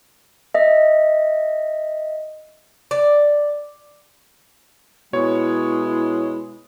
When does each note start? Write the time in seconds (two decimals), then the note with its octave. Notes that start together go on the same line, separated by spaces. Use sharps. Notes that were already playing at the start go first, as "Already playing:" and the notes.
0.54 D#5 E5
2.91 D5
5.13 B2 G#3 E4 C#5